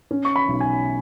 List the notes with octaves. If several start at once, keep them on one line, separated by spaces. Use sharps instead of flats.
C#4
C#6
B5
B1
G#5